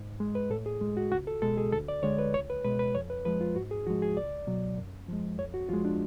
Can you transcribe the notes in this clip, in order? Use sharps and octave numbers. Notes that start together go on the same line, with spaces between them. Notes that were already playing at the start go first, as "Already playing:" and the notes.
Already playing: G#2
G#3
B4
A2 A4
G#4
G#3
F#4
C#2 F#4
A4
B2 G#3 A4
G#4
D2 A4
D5
D3 G#3 C#5
B4
C#2 C#5
B4
B2 G#3 B4
B4
F2 C#5
B4
F3 G#3 B4
F4
G#2 F#4
G#4
F3 G#3 F#4
G#4
C#2 D5
B2 F#3
F#2
F3 G#3
F2 C#5
F#4
F3 G#3 F4
D4